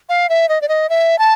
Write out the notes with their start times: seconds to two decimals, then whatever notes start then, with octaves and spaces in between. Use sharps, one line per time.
0.09 F5
0.29 E5
0.49 D#5
0.61 D5
0.69 D#5
0.89 E5
1.19 A5